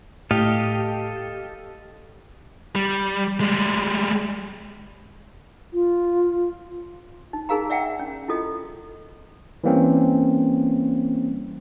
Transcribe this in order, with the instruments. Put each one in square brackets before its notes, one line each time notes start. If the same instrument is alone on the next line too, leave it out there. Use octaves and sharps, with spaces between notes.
[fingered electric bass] A2 [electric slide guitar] G4 [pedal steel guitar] A4 D#5 F5
[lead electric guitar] G3
G3 G#3
[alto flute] F4
[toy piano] D#4
D#4 G#4 A#4 F5 A#5
D5 E5 F#5 G5
C#4
E4 F4 A4 D#5
[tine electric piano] E3 G3 A#3 C4 C#4